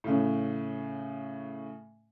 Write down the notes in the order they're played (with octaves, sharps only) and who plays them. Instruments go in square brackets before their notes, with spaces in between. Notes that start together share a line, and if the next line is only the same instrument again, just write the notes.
[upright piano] A2 C#3